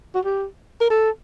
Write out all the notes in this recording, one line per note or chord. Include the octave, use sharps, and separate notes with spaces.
F#4
G4
A#4
A4